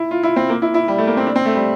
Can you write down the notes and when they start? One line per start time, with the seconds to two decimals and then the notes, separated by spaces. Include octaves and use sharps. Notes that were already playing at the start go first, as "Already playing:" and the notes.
Already playing: E4
0.11 F4
0.23 E4
0.36 C4
0.49 A#3
0.62 E4
0.74 E4
0.88 G3
0.98 A3
1.07 A#3
1.17 C4
1.27 D4
1.36 C4
1.46 A3
1.55 G3